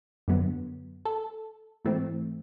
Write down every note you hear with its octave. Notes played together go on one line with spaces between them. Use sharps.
F#2 D3 F#3 B3
A4
G#2 E3 A3 C4